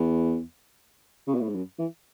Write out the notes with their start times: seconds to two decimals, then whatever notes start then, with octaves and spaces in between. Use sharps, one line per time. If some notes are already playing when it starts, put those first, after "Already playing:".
Already playing: E2
1.27 C#3
1.34 B2
1.41 A2
1.48 G#2
1.55 F#2
1.79 E3